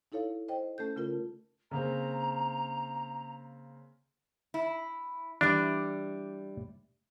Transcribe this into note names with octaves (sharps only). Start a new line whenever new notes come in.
D#4 E4 A4 C#5 F5
C5 D#5 G5
A3 C#4 A4 G6
C#3 A3 F4 A#4
C#3 A#3 C4 A#5
E4
E3 G3 D4 D5